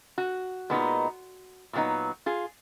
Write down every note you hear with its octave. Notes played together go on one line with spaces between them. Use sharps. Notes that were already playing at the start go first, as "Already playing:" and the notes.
F#4
A#2 G#3 B3 D#4
A#2 F#3 B3 D#4
F4 G#4